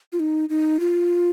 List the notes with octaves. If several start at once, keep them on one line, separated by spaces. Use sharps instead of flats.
F4
D#4
D#4
F4